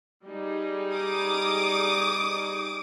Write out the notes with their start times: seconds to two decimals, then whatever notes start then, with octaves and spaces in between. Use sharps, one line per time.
0.23 G3 D#4 G#4
0.95 D6 D#6